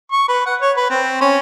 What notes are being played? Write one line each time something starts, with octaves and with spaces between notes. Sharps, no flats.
C#6
B4
F#5
C#5
B4
C4
C#4